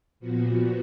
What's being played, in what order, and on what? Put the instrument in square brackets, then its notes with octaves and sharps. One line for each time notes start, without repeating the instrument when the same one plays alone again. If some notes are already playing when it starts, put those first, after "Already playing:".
[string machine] A#2 F3 B3 F#4